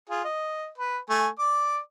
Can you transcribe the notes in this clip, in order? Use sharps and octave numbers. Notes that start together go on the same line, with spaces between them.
F4 G#4
D#5
B4
A3 G#5
D5 D6